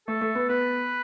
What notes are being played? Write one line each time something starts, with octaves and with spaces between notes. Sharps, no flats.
A3 A4
A3
B3
B3 B4